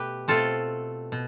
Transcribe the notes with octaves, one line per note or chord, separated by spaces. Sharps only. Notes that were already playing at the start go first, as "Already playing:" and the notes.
Already playing: B2 A3 G4 B4
B2 A3 C4 F4 A4
B2